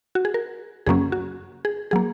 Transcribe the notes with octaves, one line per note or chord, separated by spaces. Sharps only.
F#4
G#4
A#4
F#2 C#3 F#3 A#3 C#4 G#4
F#4
G#4
F#3 A#3 G#4